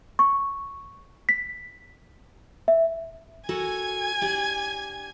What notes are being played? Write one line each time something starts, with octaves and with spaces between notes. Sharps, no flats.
C#6
B6
E5
F#4 A4 A#4 G#5 G#6
D4 G4